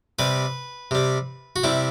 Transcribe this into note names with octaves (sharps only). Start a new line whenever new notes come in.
C3 G3 B4
C3 G3
F#4
C3 G3 E4